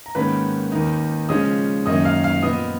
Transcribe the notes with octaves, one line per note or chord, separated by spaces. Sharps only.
A#5
G#2 D#3 A#3 C#4 B4 B5
D#2 D#3 A#3 D#4
C#3 F3 G#3 C#4 D#5 D#6
F#2 D#3 A#3 C#4 D#5 D#6
F5 F6
F5 F6
A#2 F3 B3 D#5 D#6